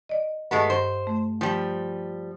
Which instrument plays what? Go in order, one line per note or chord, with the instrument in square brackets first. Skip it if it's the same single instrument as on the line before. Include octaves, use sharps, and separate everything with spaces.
[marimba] D5 D#5
[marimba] G2 D#5 A6 [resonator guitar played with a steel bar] G#3 A3 B3
[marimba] G2 [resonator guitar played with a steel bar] C5
[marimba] A3
[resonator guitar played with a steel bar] F3 G3